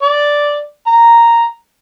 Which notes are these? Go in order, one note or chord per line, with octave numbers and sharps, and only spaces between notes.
D5
A#5